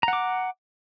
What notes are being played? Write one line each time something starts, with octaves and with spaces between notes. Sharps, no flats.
F#5 A#5 D6